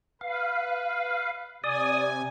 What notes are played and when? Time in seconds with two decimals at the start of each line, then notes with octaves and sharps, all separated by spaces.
0.21 B4 F5
1.64 C3 D5 G#5 D#6